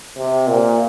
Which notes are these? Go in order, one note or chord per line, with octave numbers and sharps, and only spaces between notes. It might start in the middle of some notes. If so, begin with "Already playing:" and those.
C3
A#2